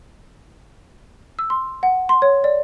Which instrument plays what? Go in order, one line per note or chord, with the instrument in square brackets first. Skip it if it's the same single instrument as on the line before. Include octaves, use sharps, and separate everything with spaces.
[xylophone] E6
C6
F#5
C6
C#5
D5